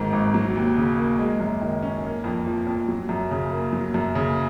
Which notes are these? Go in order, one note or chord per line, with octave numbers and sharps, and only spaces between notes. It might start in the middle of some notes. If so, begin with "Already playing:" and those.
Already playing: G#1 G#2 D#3
G#1
F#3
D#2
C#3
A#3
G#3
F#2
D#3
C#4
A#3
F2
F3
F2
F#3
F#2
C#3
A#3
F#3
F#2
C#3